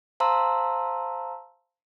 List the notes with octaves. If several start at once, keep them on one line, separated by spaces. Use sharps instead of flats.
C5 F5 A5 A#5 C6 E6